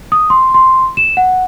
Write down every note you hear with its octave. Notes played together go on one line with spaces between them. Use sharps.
D#6
C6
C6
E7
F#5